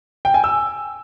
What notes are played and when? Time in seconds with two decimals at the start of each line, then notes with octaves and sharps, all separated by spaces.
0.25 G5
0.34 G#5
0.44 E6